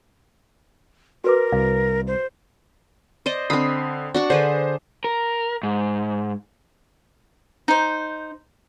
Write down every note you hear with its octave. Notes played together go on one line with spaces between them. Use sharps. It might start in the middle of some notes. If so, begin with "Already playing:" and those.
F#4 A#4 B4 D6
C2 F5
C5
C5 D5 D#5
D3 C4 B5 D#6 C7
D4 F#4 F#5 C#6
D3 G#4 B4 C5
A#4
G#2
D#4 C5